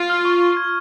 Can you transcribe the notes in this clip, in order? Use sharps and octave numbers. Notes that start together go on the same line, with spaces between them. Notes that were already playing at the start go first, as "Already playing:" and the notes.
Already playing: F4
F6
C#6
C#6
G#6